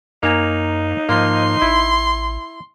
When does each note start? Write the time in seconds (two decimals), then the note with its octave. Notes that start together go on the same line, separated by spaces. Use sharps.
0.23 F#2 A#3 D#4 G#5
1.09 G#2 F3 A#3 C6
1.62 A1 E4